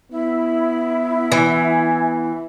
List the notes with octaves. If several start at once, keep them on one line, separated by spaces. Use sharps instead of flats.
B3 E4
E3 G#5